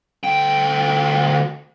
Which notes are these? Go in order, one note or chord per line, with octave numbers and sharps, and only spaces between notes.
D2 G5